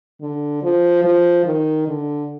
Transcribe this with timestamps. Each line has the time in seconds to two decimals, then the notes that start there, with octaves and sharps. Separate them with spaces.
0.21 D3
0.63 F3
1.04 F3
1.46 D#3
1.88 D3